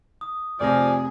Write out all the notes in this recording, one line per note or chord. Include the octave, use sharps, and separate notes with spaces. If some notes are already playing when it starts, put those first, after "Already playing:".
D#6
F1 C3 F3 G#4 D5 A#6